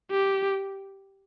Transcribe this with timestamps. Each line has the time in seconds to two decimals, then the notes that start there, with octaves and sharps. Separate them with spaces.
0.11 G4